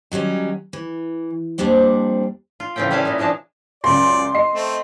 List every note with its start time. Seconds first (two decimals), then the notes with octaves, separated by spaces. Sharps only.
0.12 D#3 F#3 G3 C#4
0.73 E3
1.58 F2 A#2 G3 D4 C5
2.60 F4
2.76 A2 C#3 E3 C4 C#4 G5
2.91 G3 C#4 E4 B4 F5 A5
3.05 A#2 G#3
3.18 E3 F3 G#3 D4 A5
3.84 C#2 F#2 D5 C6
4.34 D#5 C7
4.54 A3 C4